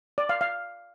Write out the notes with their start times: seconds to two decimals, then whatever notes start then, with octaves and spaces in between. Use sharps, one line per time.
0.18 D5
0.29 F5
0.41 F5